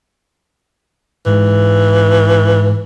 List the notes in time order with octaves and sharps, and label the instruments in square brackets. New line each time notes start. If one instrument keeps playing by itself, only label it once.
[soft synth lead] G#2 [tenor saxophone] E3